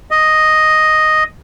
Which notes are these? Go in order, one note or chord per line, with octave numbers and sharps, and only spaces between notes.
D#5